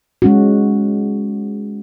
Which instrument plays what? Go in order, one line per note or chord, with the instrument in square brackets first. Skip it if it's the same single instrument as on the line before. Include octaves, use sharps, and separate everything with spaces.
[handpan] G#3 C#4 F#4